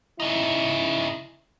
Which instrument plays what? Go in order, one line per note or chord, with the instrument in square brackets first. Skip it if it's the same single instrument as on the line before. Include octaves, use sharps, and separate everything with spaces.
[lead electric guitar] C#3 D#4 [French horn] E4